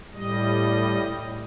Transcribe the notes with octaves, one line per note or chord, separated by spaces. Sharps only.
A2 G3 D#5